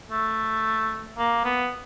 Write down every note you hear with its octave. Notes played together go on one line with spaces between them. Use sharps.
A3
A#3
B3